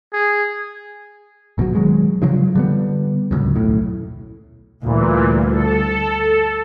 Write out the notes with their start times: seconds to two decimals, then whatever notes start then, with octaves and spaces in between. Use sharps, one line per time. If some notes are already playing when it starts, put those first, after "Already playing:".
0.13 G#4
1.58 G1 B2 D#3 F#3
1.75 D#3 F#3 G#3
2.22 G2 C#3 F3 F#3
2.55 D3 G3 B3
3.31 D1 G1 C#2 F#2
3.56 D#1 B1 A2
4.82 D2 G2 A#2 E3
5.52 A4